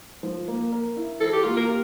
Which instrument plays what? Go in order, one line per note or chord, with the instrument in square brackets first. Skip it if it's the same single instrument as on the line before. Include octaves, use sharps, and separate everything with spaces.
[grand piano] F3
A#3
A#4
E4
[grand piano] E3 [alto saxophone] A4
[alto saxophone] G4
[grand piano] A#3 [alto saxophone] F4
[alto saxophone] A#4
[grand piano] G4